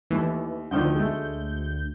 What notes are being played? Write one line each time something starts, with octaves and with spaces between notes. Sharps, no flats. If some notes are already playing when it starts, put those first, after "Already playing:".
D#2 E3 A3
D2 D3 D#3 F3 G6
G#3 A3